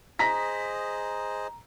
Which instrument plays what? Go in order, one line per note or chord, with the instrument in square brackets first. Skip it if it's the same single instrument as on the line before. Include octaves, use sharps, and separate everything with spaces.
[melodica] G#4 C5 D#5 [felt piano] A#5 A#6 B6